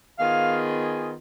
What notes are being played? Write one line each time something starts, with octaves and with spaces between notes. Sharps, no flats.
D#3 B3 F4 G#4 F5